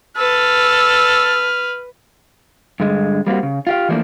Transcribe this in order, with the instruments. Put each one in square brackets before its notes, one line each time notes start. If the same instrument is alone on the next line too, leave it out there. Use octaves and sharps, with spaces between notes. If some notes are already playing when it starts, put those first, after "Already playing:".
[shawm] A4 [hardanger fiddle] B4 [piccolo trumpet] F6
[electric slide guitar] G2 D3 G#3
G3 A#3 C4 F#4
C#3
F4 G4 F5
E3 F3 A3 A#3 D4